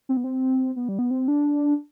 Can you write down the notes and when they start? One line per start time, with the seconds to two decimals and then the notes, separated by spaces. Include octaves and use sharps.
0.09 C4
0.17 B3
0.24 C4
0.76 B3
0.89 G3
0.99 B3
1.11 C4
1.28 D4